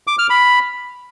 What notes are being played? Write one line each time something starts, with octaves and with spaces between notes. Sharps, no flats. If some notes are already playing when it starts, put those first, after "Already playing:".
D6
F6
B5